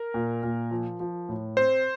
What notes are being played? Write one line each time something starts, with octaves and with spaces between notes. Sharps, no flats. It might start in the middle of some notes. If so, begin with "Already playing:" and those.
Already playing: A#4
A#2
A#2
F3
F3
A2
C4 C5